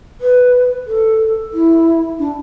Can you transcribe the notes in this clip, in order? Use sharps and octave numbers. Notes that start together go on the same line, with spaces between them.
B4
A4
E4
D4